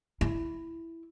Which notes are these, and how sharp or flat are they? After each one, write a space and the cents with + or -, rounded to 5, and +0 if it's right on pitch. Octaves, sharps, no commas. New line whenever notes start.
E4 +5